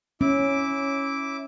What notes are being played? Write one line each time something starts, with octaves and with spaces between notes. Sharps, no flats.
C#4 E4 D6